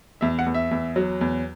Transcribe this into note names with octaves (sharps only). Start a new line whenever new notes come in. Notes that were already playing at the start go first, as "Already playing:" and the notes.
E2 E5
F#5
E2
E5
E2
F#3
E2